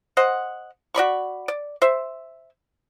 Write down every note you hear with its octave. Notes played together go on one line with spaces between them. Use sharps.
C5 D#5 F#5
F#4 D5 B5 C#6
D5
C5 E5